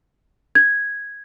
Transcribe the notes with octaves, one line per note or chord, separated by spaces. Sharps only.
G#6